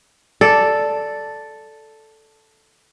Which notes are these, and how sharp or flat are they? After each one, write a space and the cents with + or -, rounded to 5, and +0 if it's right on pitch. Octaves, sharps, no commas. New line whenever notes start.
A4 +0 D5 +0